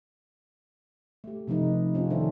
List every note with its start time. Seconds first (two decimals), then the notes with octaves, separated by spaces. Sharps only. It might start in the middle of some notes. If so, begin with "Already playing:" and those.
1.24 A3 G4
1.48 C3 F3 A3 D#4 B4
1.94 C4 C#4 F4
2.10 D#3 D4 A4 A#4 C5 E5